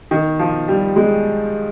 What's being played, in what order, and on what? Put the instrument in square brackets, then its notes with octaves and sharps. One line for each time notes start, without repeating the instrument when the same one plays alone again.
[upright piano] D#3
F3
G3
G#3